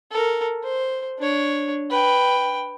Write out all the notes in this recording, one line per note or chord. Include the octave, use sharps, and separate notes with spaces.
A4 A#4
C5
D4 C#5
B4 G5